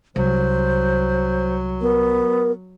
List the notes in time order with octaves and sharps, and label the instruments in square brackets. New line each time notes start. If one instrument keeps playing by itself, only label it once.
[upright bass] C2 [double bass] F#3 [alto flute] C5
[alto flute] B3 [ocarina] A#4